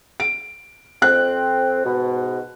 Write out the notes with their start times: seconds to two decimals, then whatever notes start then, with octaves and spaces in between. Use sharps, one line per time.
0.20 D7
1.02 F2 C4 F#6
1.85 G#2 B2